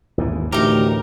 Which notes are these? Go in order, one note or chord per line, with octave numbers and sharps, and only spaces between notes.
D#2 G#2 E3
D2 A2 E3 D#4 G4 A#4